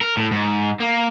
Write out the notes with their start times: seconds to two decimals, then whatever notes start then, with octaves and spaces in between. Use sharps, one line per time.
0.01 A#4
0.17 A2
0.31 G#2
0.80 A#3